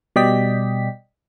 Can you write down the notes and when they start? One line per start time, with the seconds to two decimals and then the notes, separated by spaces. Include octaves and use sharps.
0.16 B2 G3 D5 D#5 G5 B6